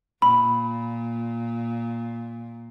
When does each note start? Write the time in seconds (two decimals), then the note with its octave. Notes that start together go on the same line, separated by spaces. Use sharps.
0.22 A#2 B5